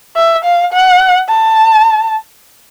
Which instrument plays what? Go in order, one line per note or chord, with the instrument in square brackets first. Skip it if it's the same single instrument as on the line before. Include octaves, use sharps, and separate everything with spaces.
[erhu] E5
F5
F#5
A5